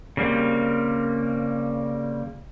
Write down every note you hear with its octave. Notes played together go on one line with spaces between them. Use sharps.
C#3 G3 A#3 C4